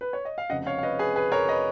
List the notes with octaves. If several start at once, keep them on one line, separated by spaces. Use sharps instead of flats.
B4
C#5
D#5
F5
F1 F2 C#3 D#5 F#5
C#5 F5
F5
B4 D#5
G#4 B4
G#4 B4
A#4 C#5
B4 D#5